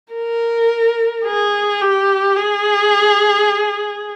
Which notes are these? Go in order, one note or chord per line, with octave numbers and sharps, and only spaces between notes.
A#4
G#4
G4
G#4